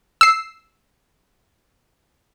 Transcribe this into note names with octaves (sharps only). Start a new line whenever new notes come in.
E6 C7